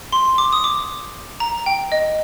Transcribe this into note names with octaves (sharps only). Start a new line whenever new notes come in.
C6
D6
D#6
D6
A#5
G5
D#5